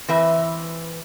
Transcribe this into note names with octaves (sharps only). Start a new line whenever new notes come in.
E3 C4 B4 E5